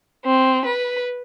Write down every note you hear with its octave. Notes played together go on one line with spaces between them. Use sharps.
C4
B4